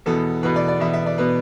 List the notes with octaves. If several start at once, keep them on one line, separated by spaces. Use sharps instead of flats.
E2 B2 B3 A4
E2 B2 B3 B4
D5
D5
E2 B2 B3 E5
E5
D5
B2 B3 B4